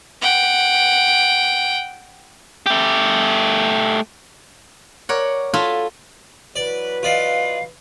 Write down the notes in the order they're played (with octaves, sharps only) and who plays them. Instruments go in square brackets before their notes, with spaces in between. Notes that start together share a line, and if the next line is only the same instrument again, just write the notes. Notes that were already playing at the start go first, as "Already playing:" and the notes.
[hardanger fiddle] F#5 G5
[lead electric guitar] A3 G4
[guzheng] A#4 C#5 D5 F#5
F4 F#4 A4 G#5 A5 B5
[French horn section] E3 F#3 B4 [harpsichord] D5
[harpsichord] F4 D5 D#5 [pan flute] F5